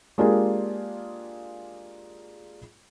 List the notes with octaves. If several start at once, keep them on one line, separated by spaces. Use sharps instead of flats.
G#3 A#3 D4 F4 G4 G#4